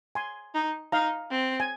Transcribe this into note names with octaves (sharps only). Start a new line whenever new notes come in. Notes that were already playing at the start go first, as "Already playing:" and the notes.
G#5 C6
D#4
D#4 F5 A#5
C4
G#5